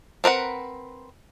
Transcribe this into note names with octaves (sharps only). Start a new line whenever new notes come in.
C4 A#4 B4 F#5